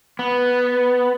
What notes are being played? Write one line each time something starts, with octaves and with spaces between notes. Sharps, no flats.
B3